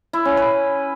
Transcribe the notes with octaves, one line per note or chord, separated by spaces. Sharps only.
E4
C#4
B4